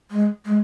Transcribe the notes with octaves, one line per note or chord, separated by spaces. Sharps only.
G#3
G#3